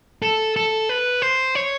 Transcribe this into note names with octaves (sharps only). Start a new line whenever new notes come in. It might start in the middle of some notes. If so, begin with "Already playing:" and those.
A4
A4
B4
C5
C#5